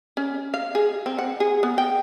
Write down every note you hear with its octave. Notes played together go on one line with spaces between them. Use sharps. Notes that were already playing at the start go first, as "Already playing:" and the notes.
C#4
F5
G#4
C4
F#5
G#4
B3
G5